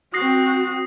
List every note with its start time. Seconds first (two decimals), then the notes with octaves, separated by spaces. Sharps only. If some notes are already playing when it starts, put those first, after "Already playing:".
0.14 C4 F#4 D#6 A#6 C7